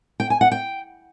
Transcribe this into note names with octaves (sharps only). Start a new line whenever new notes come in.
G5
G#5
F#5
G5